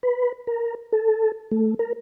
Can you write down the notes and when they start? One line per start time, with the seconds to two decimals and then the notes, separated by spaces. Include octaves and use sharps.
0.03 B4
0.47 A#4
0.92 A4
1.51 A3
1.79 A#4